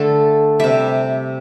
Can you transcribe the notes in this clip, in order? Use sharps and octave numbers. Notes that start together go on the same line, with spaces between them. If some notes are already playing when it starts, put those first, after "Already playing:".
Already playing: D3 A3 A4
C3 G3 E5